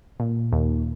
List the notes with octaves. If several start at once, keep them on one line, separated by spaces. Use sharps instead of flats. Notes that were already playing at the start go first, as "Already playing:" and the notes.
A#2
D#2